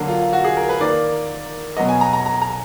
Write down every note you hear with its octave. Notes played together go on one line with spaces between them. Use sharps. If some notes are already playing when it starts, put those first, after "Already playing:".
Already playing: D3 F#3 A#3
F4
F#4
G#4
A#4
B4
D#3 A#3 D5
B2 F#3 B3 D#5
G#5
A#5
A#5
A#5
A#5